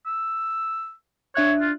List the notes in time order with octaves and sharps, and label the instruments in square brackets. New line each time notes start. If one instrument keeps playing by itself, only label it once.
[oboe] E6
[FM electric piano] D4 E5 F#6 [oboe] C#5
[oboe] F4